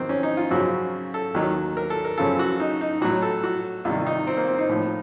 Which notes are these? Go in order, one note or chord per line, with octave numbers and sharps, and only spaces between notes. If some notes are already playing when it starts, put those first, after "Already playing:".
Already playing: F2 D#3 F#3 A#3 C4
C#4
D#4
F4
F#2 C#3 F3 F#4
A4
D#2 D#3 F#3
A#4
A4
A#4
F#2 C#3 F3 A4
F#4
D#4
D#4
A2 F#3 F#4
A4
F#4
C2 C3 D#3 F4
D#4
C4
A#3
C4
D#4
A2 F3